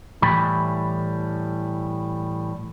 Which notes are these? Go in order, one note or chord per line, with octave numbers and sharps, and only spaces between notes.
A2 E3 G3 B5